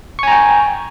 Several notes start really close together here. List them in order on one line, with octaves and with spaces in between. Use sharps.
C#6 G#5 A#5 G5